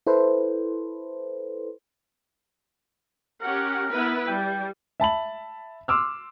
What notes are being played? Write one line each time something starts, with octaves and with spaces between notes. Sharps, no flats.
E4 A4 B4 C5
C#4 G4 A#4 F#5
B3 E4 B4
G3 G5
E5 A5 B5 F#7
C6 D6 E6 F6